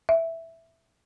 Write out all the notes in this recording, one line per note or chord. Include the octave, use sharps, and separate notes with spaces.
E5